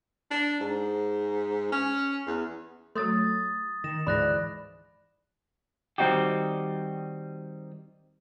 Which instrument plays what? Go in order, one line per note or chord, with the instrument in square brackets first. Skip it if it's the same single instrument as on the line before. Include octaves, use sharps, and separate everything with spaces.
[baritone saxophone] D4
G#2
C#4
E2
[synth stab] F#3 A3 [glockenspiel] C6 D#6 A6
[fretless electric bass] D#3 [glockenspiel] A#6 E7
[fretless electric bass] D2 G#2 E3 [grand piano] D5 [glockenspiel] B5 F#6 A#6
[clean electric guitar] D#3 G3 C4 D#4 F#4 G4